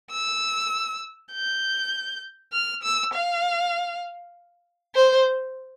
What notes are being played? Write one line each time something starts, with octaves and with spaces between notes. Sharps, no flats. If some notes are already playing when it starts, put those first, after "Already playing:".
E6
G6
F6
E6
F5
C5